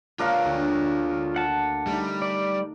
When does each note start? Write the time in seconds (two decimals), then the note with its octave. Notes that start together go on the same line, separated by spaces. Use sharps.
0.19 A#3 D4 F4 A#4 C#5 F5
0.45 D2
1.36 F#5 A5
1.87 G3 A3 D#4
2.22 D5